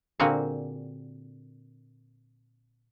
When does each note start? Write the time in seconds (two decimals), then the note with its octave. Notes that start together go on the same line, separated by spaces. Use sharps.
0.20 A#2 D3 A#3 C4 F#4 G#4